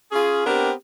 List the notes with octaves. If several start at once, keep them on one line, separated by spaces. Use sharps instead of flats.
C#4 F4 G#4
B3 C4 D4 G4 A#4